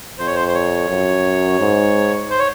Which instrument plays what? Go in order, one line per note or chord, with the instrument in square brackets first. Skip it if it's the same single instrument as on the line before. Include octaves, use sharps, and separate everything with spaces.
[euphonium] F2 [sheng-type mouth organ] C5
[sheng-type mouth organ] C#5
C5
C5
C#5
[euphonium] F#2
G#2
[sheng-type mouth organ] C5
C#5